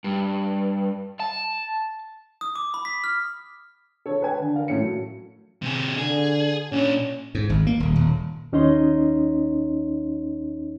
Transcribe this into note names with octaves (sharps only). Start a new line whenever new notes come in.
G2
A5
D#6
D6
B5
B6
F6
A4 C#5
B4 G5 G#5
D3
A#4 F5
A2 A3 C#4 C#7
F#3
C3 G#4
D3 G#4
A#2 C#4 D4
G#2
G#1
A#3
D#1
D#1
D#2 C#4 D#4 C#5 D#5 C6